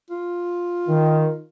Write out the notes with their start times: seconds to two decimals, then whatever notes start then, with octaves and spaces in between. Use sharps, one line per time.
0.10 F4
0.88 D#3